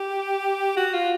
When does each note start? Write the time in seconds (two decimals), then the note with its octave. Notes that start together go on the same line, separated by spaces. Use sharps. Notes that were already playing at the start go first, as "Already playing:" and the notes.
Already playing: G4
0.76 F#4
0.93 F4